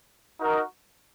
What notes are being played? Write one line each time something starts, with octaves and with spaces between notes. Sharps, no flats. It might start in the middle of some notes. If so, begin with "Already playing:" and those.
D#4 F#4 A#4 D#5